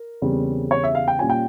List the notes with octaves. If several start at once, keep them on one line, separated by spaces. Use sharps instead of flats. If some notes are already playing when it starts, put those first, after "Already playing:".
Already playing: A#4
E2 C#3 G3 C4
C#5
E5
F5
G5
A#2 G3 C#4 F4 G#5
G5